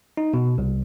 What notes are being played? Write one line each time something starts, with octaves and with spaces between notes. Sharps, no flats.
D#4
B2
C2